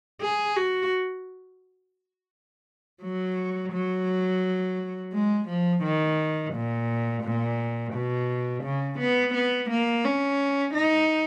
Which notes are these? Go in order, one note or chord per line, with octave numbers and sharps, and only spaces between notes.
G#4
F#4
F#3
F#3
G#3
F3
D#3
A#2
A#2
B2
C#3
B3
B3
A#3
C#4
D#4